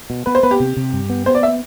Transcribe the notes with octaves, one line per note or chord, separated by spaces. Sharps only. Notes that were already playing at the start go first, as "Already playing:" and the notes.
B2
B3 B4
C5
B3 B4
G4
C3
C3
G2
B3
B3 C5
D5
E5